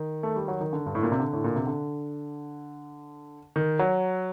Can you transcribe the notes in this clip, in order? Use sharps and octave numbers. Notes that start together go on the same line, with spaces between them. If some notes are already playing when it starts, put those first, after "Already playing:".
Already playing: D#3
A3
G3
F#3
D#3
D3
G2
A2
A#2
C3
D3
A2
A#2
C3
D3
D#3
F#3